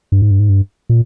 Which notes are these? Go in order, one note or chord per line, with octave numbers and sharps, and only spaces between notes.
G2
G#2
G2
G#2
G2
A#2